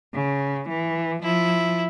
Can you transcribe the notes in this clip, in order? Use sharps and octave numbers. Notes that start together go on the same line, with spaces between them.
C#3
E3
F3 E4